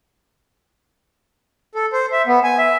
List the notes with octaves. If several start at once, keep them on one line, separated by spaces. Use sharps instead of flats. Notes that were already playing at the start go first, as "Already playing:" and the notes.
A4
C5
E5
B3
G#5
E5